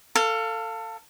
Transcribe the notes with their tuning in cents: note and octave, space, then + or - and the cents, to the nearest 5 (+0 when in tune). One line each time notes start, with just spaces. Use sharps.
A4 +25 F5 +0